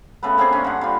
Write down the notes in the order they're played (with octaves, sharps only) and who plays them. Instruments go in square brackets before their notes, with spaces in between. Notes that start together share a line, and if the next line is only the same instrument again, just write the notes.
[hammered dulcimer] C#3 A3 B3 B4
A#3 C4 D4 G#4
G2 C#4 C6
D3 F#5
G3 F4